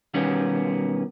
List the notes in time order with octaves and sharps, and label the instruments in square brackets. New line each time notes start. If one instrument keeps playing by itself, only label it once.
[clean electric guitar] B2 D#3 G3 A#3 B3 C#4